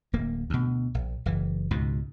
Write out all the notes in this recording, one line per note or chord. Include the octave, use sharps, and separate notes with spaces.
D1 A#3
D2 B2
A#1
F#1 E3
C#2 G#2 B2